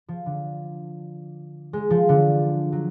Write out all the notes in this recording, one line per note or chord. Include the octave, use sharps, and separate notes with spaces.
F3
D3
G#3
F3
D3
F#3